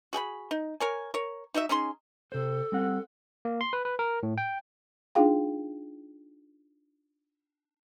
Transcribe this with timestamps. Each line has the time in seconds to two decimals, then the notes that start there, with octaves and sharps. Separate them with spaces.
0.13 F#4 G#4 G5 B5
0.51 D#4
0.80 A#4 C#5 G#5
1.14 A#4 C#5
1.54 D#4 F#4 D#5 E5
1.69 C#4 D#4 G#4 C6
2.32 C3 A4 C5
2.72 G3 C4 F#5
3.45 A#3
3.61 C6
3.73 B4
3.85 B4
3.99 A#4
4.23 A2
4.38 G5
5.15 D4 D#4 F4 G#4 F5 G5